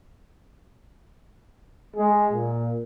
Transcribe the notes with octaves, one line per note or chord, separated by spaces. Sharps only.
G#3
A#2